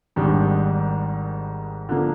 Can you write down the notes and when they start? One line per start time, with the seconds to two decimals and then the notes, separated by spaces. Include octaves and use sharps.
0.16 G#1 G#2 D#3 G3 D4
1.89 D3 F3 A#3 D4